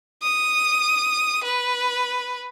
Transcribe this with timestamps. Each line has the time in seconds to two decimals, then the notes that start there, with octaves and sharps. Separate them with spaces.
0.23 D#6
1.44 B4